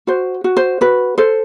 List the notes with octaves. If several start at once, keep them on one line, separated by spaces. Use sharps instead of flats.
F#4 C5
F#4
C5
F#4 B4
A4 C5